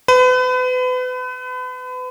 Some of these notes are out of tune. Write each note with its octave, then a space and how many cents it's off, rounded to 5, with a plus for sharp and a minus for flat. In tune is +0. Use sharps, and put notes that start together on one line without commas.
B4 +35